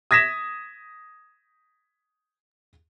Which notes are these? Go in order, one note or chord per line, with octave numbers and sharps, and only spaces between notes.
D#6 G#6 A#6 B6 E7